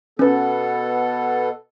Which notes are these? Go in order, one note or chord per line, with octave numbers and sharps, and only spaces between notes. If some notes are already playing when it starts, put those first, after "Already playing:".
B2 B3 C#4 A4 B4